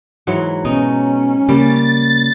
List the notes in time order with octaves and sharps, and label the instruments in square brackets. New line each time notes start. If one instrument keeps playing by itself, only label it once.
[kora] G#2 E3 F#3
[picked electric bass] B2 [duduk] C#4 [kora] D#4
[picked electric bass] C#3 A#3 [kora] G3 [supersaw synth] A6